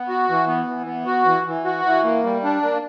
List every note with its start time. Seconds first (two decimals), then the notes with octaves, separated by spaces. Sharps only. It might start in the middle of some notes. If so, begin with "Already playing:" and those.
Already playing: B3
0.08 F#4
0.29 E3
0.47 B3
0.67 E3
0.86 B3
1.06 F#4
1.26 E3
1.46 E3
1.65 F#4
1.85 E3
2.04 A#3
2.24 G3
2.44 D4
2.63 A#3